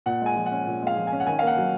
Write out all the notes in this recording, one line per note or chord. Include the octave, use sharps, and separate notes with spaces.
A#2 F#5
G#3 G#5
F3
F#5
C#4
A#2
G#3
F5
F3
C#4 G#5
F#5
D#3 G#5
F5
A#3 F#5
F#3